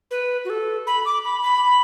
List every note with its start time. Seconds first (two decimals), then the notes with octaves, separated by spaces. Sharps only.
0.11 B4
0.45 F#4
0.50 A4
0.87 B5
1.06 D6
1.24 B5
1.43 B5